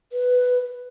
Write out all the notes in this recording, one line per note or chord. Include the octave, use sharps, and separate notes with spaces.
B4